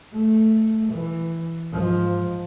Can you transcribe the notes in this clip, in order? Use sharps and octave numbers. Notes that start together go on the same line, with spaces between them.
A3
E3
G#2 F3